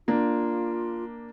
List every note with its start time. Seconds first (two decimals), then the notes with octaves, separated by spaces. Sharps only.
0.08 A#3 D4 F4